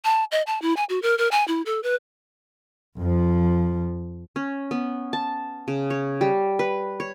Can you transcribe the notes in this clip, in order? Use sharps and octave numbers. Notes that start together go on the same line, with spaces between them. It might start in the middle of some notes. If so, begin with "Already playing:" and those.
A5
D#5
A5
E4
G#5
F#4
A#4
A#4
G#5
E4
A4
B4
F2 F3
C#4
B3
A5
C#3
C#5
G3
B4
C#5